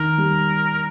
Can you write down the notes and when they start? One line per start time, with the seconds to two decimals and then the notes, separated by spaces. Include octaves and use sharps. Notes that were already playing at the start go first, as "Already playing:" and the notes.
Already playing: D#3 A#4
0.18 G3